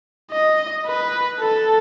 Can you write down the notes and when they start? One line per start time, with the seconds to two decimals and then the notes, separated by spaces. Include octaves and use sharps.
0.32 D#5
0.86 B4
1.40 A4